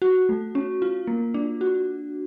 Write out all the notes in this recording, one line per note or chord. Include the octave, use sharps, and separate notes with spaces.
F#4
A3
C#4
F4
A#3
D4
F#4